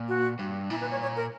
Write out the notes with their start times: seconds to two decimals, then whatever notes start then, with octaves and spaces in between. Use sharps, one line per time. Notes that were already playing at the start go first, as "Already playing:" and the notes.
Already playing: A#2
0.09 F#4
0.39 G2
0.70 A#2 E4
0.81 B4
0.91 C#5
1.02 C#5
1.16 A#4